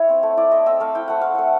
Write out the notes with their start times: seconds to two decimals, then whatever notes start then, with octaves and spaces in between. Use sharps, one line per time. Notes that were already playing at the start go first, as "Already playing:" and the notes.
Already playing: E4 C#5
0.09 C4
0.23 A3
0.37 E4 D5
0.51 A3 D#5
0.66 C4 E5
0.80 A3 F5
0.95 E4 G5
1.08 A3 F#5
1.21 C4 F5
1.35 A3 F#5